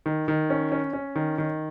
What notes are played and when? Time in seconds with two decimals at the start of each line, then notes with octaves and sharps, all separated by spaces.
0.06 D#3
0.28 D#3
0.50 C#4
0.72 C#4
0.93 C#4
1.16 D#3
1.38 D#3